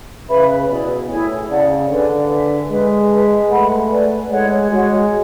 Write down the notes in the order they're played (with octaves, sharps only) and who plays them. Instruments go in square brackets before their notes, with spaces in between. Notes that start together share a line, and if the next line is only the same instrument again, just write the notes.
[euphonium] C#3 [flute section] B4 E5 B5
[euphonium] B2 [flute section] E4 G#4 D5
[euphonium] A2 [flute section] E4 G#4 C#5 G#5
[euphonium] C#3 [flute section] G#4 D5 F#5 A5
[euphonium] D3 [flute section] B4 D5 G#5
[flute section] B4 E5 G#5
[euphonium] G#3 [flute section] B4 E5 G#5
[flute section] B4 E5 A5
[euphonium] A3 [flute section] B4 F#5 B5
[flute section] B4 D5 G#5
[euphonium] G#3 [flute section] E4 A4 C#5 F#5
[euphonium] G#3 [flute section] F#4 C#5 F#5